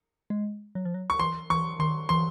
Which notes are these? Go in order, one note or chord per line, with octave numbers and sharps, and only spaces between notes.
G#3
F#3
F3
F#3
C#6
E3 C6
E3 C#6
D#3 C6
E3 C6